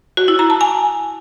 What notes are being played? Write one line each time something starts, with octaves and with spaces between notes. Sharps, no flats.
F#4
E4
A#5
A5
G#5